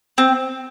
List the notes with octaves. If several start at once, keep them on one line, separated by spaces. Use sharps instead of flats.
C4